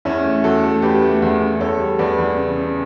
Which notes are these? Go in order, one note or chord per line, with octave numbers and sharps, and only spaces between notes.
E2 C#4 E4
A3
E2 F#4 A4
A3
E2 G4 B4
A3
E2
E2
E2 A4 C#5
G3
E2 B4 D5
E2
C#3
C#3